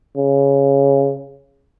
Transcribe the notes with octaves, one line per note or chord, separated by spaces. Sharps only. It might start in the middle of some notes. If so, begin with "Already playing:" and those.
C#3